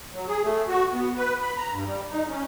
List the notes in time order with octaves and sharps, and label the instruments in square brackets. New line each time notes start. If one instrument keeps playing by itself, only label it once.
[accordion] F#3
G#4
A3
F#4
B3
B4
B5
A#5
G2
G3
D#4
C#4